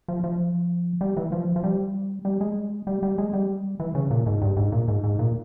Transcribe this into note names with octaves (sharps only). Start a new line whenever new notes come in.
F3
F3
G3
E3
F3
F3
G3
G3
G#3
G3
G3
G#3
G3
E3
C#3
A#2
G#2
G2
G#2
A#2
G#2
G#2
A#2